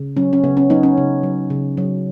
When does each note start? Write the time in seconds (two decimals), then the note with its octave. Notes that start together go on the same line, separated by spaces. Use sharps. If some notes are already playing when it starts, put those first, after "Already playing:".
Already playing: C#3
0.17 F#3 C#4
0.33 C#4
0.44 C#3 B3
0.57 C#4
0.70 F#3 B3 D#4
0.83 C#4
0.97 C#3
1.23 F#3
1.50 C#3
1.77 F#3